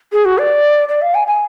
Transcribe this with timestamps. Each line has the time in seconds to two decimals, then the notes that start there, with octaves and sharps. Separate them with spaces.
0.13 G#4
0.25 F#4
0.38 D5
0.89 D5
1.02 F5
1.15 G#5
1.27 G#5